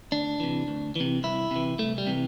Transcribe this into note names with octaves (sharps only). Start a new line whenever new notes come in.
D2 D4
C3 E3
D2
C3 E3
C2 E4
C3 E3
C2 A3
G3
C3 E3